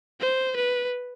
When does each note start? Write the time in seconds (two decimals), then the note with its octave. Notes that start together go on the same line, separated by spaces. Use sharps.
0.20 C5
0.56 B4